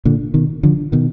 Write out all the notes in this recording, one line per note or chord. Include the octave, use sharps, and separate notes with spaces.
A#2 D3
B2 D#3
D3 F3
B2 D#3